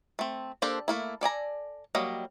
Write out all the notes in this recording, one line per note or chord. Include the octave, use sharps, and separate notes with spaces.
A3 C4
A#3 D4 G4 A4 C5
A3 A#3 E4
A4 D5 G#5 A#5
F#3 G3 A#3 D#5